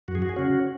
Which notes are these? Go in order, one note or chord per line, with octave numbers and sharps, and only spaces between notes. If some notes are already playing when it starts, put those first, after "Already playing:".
F#2 F#4
G#4
F#4
G#4
C#3 C#4 F#4